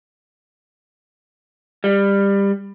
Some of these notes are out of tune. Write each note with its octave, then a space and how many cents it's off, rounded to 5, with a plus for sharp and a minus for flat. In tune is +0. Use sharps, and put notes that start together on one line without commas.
G3 +20